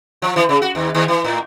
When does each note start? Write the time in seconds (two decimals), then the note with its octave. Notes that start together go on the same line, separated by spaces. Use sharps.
0.22 F3
0.36 E3
0.49 C#3
0.62 F#4
0.75 D#2
0.95 D#2
1.08 E3
1.24 A2